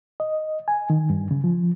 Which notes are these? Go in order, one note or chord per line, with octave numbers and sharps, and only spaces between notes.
D#5
G#5
D#3
G2
C#3
F3